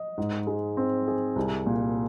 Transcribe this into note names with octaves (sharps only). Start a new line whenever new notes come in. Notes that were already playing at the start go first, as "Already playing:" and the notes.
Already playing: D#5
G#2
G#3
C4
G#4
C2
A#2